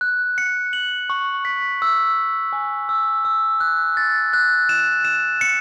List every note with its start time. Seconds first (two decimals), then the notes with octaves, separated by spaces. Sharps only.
0.01 F#6
0.38 C#7
0.73 F#7
1.10 C#6
1.45 B6
1.82 E6
2.17 E6
2.53 G#5
2.89 E6
3.25 E6
3.60 F#6
3.97 A6
4.33 F#6
4.69 E7
5.05 E7
5.41 C#7